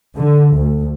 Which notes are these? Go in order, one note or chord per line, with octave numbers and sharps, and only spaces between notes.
D3
D2